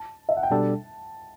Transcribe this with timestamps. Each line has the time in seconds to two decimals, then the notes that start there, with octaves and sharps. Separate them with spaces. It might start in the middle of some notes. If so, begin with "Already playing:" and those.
Already playing: A5
0.29 E5
0.37 F#5
0.43 G5
0.51 B2 G3 D4 A4 A5